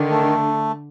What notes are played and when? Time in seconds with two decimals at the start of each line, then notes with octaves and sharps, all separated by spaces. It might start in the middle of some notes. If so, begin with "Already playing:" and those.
Already playing: D3 D#3
0.10 A3